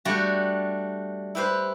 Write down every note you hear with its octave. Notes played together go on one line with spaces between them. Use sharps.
G3 A3 D4 F#4
E4 G4 B4 C5